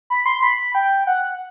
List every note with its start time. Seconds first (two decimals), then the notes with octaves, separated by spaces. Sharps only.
0.10 B5
0.26 C6
0.43 B5
0.75 G5
1.07 F#5